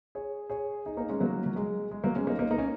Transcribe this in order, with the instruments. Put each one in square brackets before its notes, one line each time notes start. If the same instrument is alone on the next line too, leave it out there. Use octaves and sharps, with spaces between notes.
[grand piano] G#4 C#5
G#4 C#5
D#4 G#4
A#3 D#4
G#3 C#4
F#3 A#3
F#3
G#3
G#3
F#3 A#3
G#3 C#4
A#3 D#4
A#3 D#4
A#3 D#4
C#4